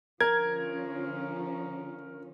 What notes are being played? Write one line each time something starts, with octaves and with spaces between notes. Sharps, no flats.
D3 F3 C#4 A#4 G#6